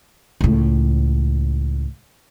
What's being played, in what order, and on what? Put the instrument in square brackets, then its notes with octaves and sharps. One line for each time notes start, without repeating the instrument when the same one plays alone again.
[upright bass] C#2 A2